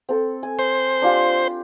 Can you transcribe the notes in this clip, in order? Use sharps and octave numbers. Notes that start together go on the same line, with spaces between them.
C4 A4
G#5
C5
D4 F4 G4